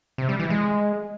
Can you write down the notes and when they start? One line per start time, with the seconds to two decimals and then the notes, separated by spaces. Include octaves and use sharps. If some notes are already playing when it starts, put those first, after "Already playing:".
0.18 C3
0.29 G3
0.40 E3
0.50 G#3